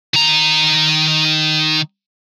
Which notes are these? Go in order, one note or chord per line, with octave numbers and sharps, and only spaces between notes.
D#3 A#5